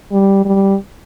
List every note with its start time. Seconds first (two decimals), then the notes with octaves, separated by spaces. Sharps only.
0.12 G3
0.45 G3